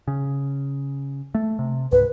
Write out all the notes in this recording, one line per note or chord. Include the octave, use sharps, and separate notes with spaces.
C#3
A3
C3
C#2 G#2 B4